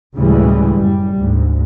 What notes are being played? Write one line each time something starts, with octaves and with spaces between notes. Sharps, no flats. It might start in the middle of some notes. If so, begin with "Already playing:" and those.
D2 A2 C#3 E3 G3 G#3
F#1 G3
D2 G#2